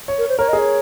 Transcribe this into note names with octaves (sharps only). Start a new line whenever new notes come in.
C#5
A#4
C5
A#4 C#5
D#5
G#4
C#5